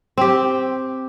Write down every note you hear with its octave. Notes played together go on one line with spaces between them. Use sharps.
C4 G4